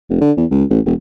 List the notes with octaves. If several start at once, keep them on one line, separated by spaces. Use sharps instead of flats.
F1
D3
E2
C#2
A1
E1